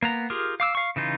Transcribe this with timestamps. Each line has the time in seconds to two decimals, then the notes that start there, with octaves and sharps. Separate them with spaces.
0.03 A#3 B3 A#5
0.30 F4 G4 G#4 A#4
0.60 F5 D6 E6
0.75 F5 C#6
0.96 C#3 E3 D#4 F4